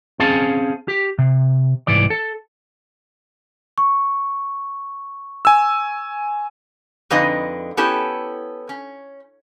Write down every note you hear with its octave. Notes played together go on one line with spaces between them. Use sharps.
C4 C#4 G#4 F5 A5
G4
C3
C2 G#2 E3 D5
A4
C#6
G#5 E6
F2 D3 G#3 D#4 B4 D#5
B3 C#4 E4 G4 A4
C#4